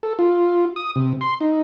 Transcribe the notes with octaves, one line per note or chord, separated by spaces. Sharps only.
A4
F4
D#6
C3
C6
D#4